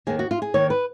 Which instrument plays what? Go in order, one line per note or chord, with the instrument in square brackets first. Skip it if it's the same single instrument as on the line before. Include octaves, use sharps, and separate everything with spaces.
[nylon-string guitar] D#2 D#3 G#4
F#4
F4
G#4
D#2 D#3 C#5
B4